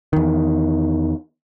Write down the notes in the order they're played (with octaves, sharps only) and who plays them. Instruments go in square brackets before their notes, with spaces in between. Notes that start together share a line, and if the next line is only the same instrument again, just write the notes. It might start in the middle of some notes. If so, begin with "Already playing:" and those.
[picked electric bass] E2 D#3